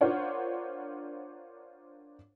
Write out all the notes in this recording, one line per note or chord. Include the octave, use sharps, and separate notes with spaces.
D4 F4 A#4 C5 C#5 F#5